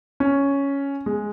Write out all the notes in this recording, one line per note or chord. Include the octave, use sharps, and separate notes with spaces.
C#4
G#3